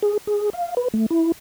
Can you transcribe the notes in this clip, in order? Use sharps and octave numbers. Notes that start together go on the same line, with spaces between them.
G#4
G#4
F5
B4
A3
E4